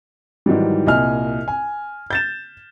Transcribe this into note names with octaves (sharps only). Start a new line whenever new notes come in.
G#2 D#3 E3 F#3 G3
C2 A#2 D#5 G#5 F6
G#5
G6 A6 E7